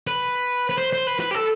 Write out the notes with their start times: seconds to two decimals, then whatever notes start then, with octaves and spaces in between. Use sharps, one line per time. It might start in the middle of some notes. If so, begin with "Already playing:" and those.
0.07 B4
0.69 B4
0.78 C5
0.93 C5
1.07 B4
1.20 B4
1.31 G4
1.35 A4